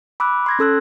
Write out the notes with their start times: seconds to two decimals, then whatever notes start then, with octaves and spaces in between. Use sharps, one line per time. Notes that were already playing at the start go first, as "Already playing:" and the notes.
0.20 B5 D6 E6 F#6
0.46 C6 G#6 A#6
0.59 C#4 A4 E6 F#6